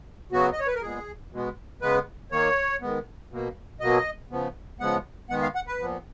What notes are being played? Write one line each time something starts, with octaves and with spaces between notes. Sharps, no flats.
C#3 F#3 B3 F#4
D#5
C#5
B4
A#4
A#2 G#3 B3 G#4
B2 G#3 B3
C#3 G#3 B3 B4
D#3 A#3 C#5
D#3 G#3 B3
B2 A#3
B2 F#3 A#3 D#5
C#3 F3 B3
C#3 F3 G#3 B3 F#5
D#3 G#3 B3 F#5
F5
F#5
B4
A#2 F3 B3